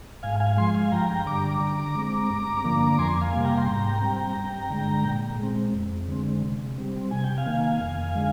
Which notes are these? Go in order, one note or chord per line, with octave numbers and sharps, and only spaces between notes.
G#2 F5 G#5
F5 G#5
F3 G#3 G#5 C6
F5 G#5
G2 G5 A#5
D3 G3 A#5 D6
D3
G#3 C4
G2
D3 F3 A#3
F2 G#5 C6
F5 G#5
C3 G3 A#3
G5 A#5
C6
G#2 G5 A#5
G3 C4
G2
D3 G#3
A#2
G#3 C4
F2
D3 G#3 C4
C3
G3 C4
C3 G#5
G5
F5 G#5
D#3 A#3
F2
D3 G#3